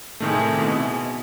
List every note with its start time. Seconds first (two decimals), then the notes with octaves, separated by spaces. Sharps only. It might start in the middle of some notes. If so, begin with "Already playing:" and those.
0.20 A2 C3 D#3 G#3 A3 E4
0.58 B2